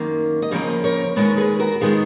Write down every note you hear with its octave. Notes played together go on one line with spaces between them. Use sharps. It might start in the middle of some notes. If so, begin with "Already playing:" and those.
Already playing: F#2 D#3 A#3
D#5
F2 C#3 F3 A#3 A#4 C#5
A#4 C#5
D#2 D#3 G#3 B3 A#4 C#5
G#4 B4
F#4 A#4
D#3 G#3 B3 F4 G#4